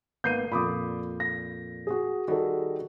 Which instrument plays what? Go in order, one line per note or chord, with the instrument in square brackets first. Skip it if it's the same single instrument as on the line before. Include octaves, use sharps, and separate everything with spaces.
[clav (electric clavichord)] G#1 A#3 B3 [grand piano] G6 C7 D#7
[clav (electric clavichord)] F2 A#2 [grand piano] B5 D6 D#6
[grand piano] A#6
F#4 G#4
[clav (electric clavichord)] D#3 G3 [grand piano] F#4 G#4 A4